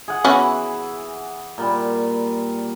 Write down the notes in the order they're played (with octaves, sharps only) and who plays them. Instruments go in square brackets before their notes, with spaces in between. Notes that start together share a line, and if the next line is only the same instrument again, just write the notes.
[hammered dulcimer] G#4 F#5
[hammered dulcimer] E3 B4 [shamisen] B3 C#4 F#4
[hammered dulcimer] A#2 G3